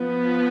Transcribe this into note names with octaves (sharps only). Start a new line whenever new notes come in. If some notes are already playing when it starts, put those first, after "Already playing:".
Already playing: F3 B3